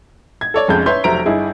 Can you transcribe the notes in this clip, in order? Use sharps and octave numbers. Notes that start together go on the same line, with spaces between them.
G#6
A4 C#5 D5
F1 F2 G#3 C#4 G6
B4 C#5 E5 C6 G6
F1 F#3 C5 E5 A#5 D7
G1 D#4 E4 G#4